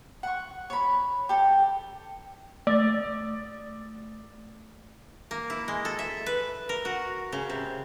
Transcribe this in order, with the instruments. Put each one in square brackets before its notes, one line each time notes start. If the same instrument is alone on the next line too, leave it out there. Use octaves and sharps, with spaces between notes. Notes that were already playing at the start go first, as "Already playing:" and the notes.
[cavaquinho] F#5 C#6
C#5 B5
G4 A4
[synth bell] A3 [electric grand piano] D5
[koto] A#3
E4
G#3
A4
E5
B4
A#4
F#4
C#3
C3